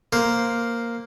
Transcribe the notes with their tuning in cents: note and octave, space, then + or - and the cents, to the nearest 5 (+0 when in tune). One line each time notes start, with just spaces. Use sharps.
A#3 +0 C5 +0